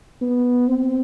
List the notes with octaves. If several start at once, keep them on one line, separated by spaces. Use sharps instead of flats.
B3
C4